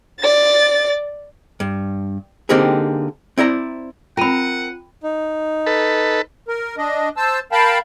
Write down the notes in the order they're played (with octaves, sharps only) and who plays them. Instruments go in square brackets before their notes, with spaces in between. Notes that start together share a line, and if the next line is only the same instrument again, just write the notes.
[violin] D5 A6
[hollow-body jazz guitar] G2
D3 A#3 C4 D#4 G4 G#4
C4 E4 D5 A#5
[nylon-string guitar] C4 A#4 [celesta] F4 D#7 [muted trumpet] F#5 [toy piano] G5 B5
[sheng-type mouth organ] D#4
[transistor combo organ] A4 B4
[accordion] A#4
D4 D#5
C5 A5 E6
A#4 F5 G5 A5 B5